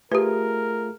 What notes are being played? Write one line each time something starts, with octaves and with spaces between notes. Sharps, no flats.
A3 F4 G4 G#4 A#4 B4